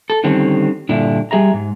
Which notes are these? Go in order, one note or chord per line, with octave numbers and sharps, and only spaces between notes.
A4
D3 D#3 G3 C4 C#4
G2 A#2 D3 D4 E4
G3 G#4 E5 A#5
G#2